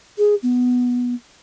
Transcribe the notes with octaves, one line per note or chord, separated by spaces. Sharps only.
G#4
B3